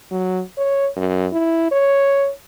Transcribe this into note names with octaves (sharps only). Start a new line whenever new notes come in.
F#3
C#5
F#2
E4
C#5